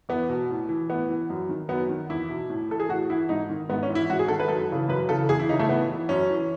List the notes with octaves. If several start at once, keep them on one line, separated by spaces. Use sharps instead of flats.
E2 B3
B2
A2
E3
A2 B3
E3
F#2
D#3
F#2 B3
D#3
E2 E4
B2
A2
E3 A4
G#4
A2 F#4
E3 E4
G#2 D#4
D#3
G#2 B3
C#4
E3
E4
G#2 F#4
G#4
D#3 A4
B4
F#2 A4
C#3 E3
F#2 B4
C#3 E3 A4
E2 G#4
E4
C#3 E3 D#4
A3
A2 B3
E3
F#2 C#4
E3